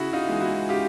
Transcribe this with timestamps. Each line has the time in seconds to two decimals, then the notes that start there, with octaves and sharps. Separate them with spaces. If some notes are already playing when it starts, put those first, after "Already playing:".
Already playing: C#3 E4 F#4
0.13 D#4 F4
0.27 E3 G#3
0.41 E4 F#4
0.69 C#3 F4 G4